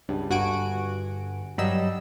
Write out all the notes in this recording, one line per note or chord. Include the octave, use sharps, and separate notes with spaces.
C#2 G2
G1 G2 F#4 F#5 G#5 D7
G2 F#3 G3 D#5 E6